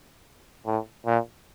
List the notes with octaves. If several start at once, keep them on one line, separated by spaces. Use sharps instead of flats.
A2
A#2